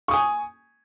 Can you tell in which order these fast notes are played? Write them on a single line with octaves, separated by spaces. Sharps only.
C#6 D#6 G#5